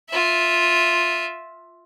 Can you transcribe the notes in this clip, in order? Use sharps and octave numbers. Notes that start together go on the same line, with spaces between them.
F4 E5